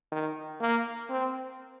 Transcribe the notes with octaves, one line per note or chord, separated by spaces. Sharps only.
D#3
A#3
C4